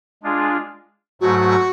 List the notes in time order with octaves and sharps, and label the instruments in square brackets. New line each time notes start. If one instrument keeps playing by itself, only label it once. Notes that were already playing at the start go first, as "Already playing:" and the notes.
[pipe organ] G#3 D4 F4 G#4
[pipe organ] G#2 F#3 A3 [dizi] F#4